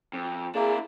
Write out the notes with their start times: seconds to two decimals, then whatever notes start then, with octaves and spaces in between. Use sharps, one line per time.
0.13 F2
0.55 A#3 D4 E4 G#4